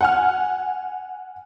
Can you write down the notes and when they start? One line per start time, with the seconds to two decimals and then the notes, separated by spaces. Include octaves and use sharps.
0.01 F#5 G#5 F6